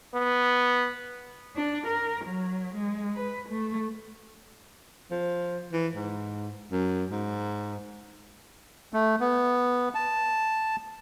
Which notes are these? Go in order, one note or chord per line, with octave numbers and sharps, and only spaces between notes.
B3
D4
A#4
F#3
G#3
B4
A3
F3
E3
G#2
F#2
G#2
A3
B3
A5